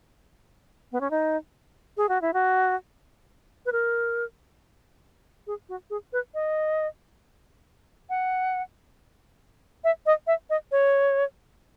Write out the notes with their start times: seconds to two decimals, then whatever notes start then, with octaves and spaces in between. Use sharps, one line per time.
0.92 B3
1.01 C#4
1.11 D#4
1.97 G#4
2.09 F#4
2.22 E4
2.33 F#4
3.66 B4
3.72 A#4
5.47 G#4
5.69 F#4
5.90 G#4
6.13 B4
6.34 D#5
8.10 F#5
9.84 E5
10.06 D#5
10.27 E5
10.50 D#5
10.72 C#5